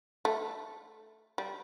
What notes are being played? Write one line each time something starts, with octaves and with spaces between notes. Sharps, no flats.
A3
G3